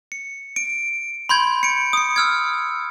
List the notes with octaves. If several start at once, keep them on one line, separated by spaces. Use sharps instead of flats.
C#7
D7
B5 C6 G6 G#6
C#7 D7
D#6 C#7
E6 F6 G#6